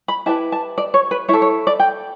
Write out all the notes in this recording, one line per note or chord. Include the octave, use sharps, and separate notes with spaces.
B5
E4 G4 B4 A5
A5
D5
C#5
B4
E4 A4 C#5
C#5
D5
G5